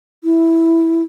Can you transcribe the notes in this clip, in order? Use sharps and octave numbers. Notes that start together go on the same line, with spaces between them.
E4